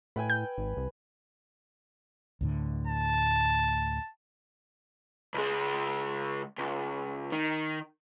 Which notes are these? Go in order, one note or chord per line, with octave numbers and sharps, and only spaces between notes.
A2 B4 G5 G#5
G6
G#1
C2
D2 A2 D3
A5
C#2 G#3
C#2
D#3